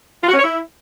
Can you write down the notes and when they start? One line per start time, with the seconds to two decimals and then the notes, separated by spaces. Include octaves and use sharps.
0.24 F4
0.29 F#4
0.34 C#4
0.39 C#5
0.44 E4